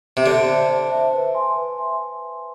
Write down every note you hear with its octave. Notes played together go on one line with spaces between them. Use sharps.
C3
D3 C5
E5 A5
C5
E5 A5
B4
E5 G#5 C6
B4
E5 G#5 C6